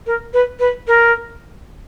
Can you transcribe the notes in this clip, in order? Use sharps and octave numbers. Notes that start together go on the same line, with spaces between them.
A#4
B4
B4
A#4